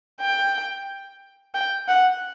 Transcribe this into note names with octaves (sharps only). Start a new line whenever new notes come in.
G5
G5
F#5